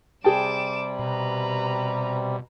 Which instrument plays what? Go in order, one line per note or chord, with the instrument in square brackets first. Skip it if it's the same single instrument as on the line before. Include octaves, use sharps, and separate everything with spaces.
[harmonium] C3 G3 [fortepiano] G#4 G5 A5 [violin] D6 E7
[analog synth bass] B2 [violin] B4 A#5